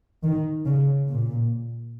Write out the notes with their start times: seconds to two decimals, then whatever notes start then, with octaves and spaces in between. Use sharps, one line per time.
0.23 D#3
0.66 C#3
1.07 A#2